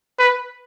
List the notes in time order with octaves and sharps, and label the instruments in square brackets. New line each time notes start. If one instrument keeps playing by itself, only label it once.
[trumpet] B4